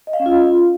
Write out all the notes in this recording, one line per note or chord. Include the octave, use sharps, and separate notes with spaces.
D#5
F5
C#4
F4